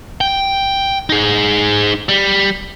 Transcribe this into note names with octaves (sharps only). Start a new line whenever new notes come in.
G5
D#4 G#4
G3